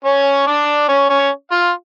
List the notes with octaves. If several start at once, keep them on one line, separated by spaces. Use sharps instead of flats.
C#4 C#5
D4 D5
C#4 C#5
C#4 C#5
F4 F5